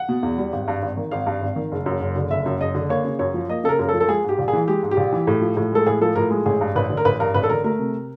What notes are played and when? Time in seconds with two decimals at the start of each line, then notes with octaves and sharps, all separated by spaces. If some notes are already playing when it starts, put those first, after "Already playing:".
Already playing: F#5
0.09 B2
0.23 E2
0.38 G3
0.53 G#1
0.68 G2
0.82 G#1
0.97 D#3
1.11 G#1 F5
1.26 G2
1.42 G#1
1.56 D#3
1.72 F#1
1.86 F#2
2.00 F#1
2.16 D3
2.31 F#1 E5
2.46 F#2
2.60 F#1 D#5
2.75 D3
2.89 A#3 C#5
3.05 C#3
3.19 F#2 C#5
3.34 F3
3.50 A#3 D#5
3.64 C#3 A4
3.69 A#4
3.79 F#2 A#4
3.89 A4
3.93 F3
4.00 A4
4.08 G#3 G#4
4.24 G#2 G4
4.39 A#1
4.48 G#4
4.53 E3
4.68 G#3 G4
4.83 G#2
4.91 G4
4.97 A#1
5.12 E3
5.27 A2
5.42 F3
5.57 A2
5.72 G#3 A4
5.87 A2 G#4
6.01 F3 A4
6.16 A2 A#4
6.30 G#3
6.46 A1 G#4
6.61 G2
6.75 A1 B4
6.90 D3
6.97 A#4
7.05 A1 B4
7.20 G2 A#4
7.34 A1 B4
7.43 A4
7.49 D3 A#4
7.64 A3 A#4
7.79 C3